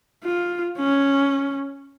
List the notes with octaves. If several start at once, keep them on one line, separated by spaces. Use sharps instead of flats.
F4
C#4